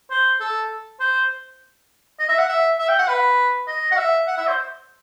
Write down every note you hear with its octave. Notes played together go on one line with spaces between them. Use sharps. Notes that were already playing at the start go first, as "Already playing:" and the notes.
C5
A4
C5
D#5
E5
F#5
E5
E5
G5
F#5
B4
D#5
F#5
E5
F#5
E5
C5